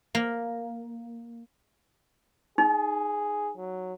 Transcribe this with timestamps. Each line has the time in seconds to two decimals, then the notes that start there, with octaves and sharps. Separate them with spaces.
0.15 A#3
2.58 D#4 G#4
3.57 F#3